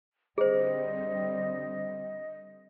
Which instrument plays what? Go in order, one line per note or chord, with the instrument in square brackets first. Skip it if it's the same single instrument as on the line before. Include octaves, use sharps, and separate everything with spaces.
[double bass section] D3 G3 C4 [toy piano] G#4 C5 [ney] D#5